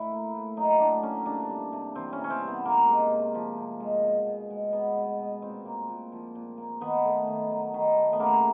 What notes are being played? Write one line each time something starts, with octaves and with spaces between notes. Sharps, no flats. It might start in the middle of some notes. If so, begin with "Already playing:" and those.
Already playing: A2 E4
A#3
A2
F#3 D#4
A2 D4
A#3 C#4
C3 D4
G3
C3
E3 C4
C#4
C3
C#4
C4
G3
B3
C3 A#3
G#3
C3
F3
C3
G#3
B2
B2
G#3
G#3 B3
B2
B2
A#2 C4
A#3
A#2
F3
A#2
A#3
D#3 B3
A3
D#3
F#3
D#3
A3
B3
C#3 A#3